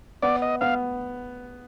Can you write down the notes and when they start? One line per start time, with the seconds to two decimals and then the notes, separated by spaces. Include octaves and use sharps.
0.22 B3 D5
0.42 D#5
0.61 B3 F5